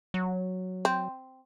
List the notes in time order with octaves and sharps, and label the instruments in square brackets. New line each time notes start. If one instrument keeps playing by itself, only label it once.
[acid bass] F#3
[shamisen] C4